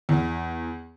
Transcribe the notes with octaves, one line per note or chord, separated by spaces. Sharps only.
E2